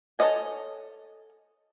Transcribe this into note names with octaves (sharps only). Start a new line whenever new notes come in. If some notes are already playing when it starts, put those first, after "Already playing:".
A4 B4 C#5 D#5 G#5